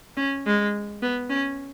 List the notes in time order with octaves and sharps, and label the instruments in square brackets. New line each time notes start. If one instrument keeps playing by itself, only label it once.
[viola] C#4
G#3
B3
C#4